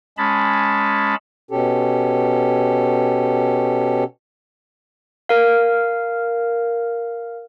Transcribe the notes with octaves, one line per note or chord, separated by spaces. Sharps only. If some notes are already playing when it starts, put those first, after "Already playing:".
G#3 C#4 A5 B5
B2 C#4 G4 A4
A#4 F5